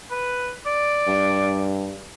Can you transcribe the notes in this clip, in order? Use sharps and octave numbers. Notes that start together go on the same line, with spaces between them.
B4
D5
G2